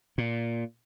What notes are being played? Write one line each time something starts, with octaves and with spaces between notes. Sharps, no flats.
A#2